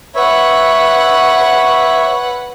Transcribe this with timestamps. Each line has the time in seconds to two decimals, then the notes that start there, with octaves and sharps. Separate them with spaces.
0.15 B4 C#5 E5 F#5